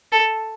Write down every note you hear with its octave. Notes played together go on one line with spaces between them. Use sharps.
A4